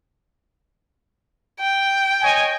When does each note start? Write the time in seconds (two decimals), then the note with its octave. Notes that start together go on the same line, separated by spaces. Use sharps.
1.60 G5
2.23 C#5 D#5 G#5